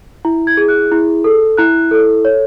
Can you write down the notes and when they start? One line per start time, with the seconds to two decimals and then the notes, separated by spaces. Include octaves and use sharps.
0.25 E4
0.47 G#6
0.57 G#4
0.68 F#6
0.92 E4
1.24 A4
1.57 E4 F#6
1.91 A4
2.25 C#5